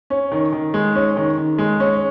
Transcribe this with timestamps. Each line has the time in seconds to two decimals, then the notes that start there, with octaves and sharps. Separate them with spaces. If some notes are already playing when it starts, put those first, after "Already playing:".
0.10 C#4
0.31 D#3
0.52 D#3
0.74 G#3
0.95 C#4
1.16 D#3
1.38 D#3
1.58 G#3
1.80 C#4